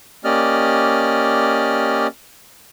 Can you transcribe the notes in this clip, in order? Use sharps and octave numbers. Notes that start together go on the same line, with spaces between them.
A#3 C#4 G4 D5 D#5 F6